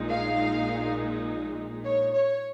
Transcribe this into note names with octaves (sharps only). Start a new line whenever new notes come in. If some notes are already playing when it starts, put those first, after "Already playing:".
Already playing: A#1 A#2 G#3 D#4
F5
C#5
C#5